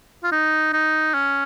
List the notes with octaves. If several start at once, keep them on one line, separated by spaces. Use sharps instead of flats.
F4
D#4
D#4
C#4